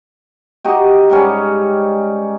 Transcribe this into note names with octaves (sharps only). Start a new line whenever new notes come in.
D#4 F#4 G4
G#2 G3 C#4